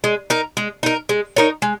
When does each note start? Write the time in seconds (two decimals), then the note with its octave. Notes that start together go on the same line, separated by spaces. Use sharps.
0.04 G#3
0.30 D#4 A#4
0.57 G#3
0.83 D#4 A#4
1.09 G#3
1.36 D#4 A#4 C#5
1.62 G#3